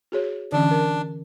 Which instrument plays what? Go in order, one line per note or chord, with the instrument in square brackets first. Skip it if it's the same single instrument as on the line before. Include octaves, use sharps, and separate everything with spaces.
[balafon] F#4 G#4 C#5
[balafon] D3 E3 C#4 [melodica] D4
[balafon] A#4